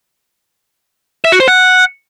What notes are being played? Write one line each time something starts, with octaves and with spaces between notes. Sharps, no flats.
E5
F#4
C5
F#5